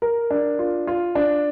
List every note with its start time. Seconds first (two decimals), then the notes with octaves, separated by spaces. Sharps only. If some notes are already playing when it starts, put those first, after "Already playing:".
0.02 A#4
0.31 D4
0.59 F4
0.87 F4
1.15 D4